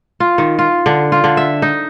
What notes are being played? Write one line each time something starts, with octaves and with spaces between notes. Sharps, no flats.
F4
D#3
F4
D3
F4
D3
E5
D#4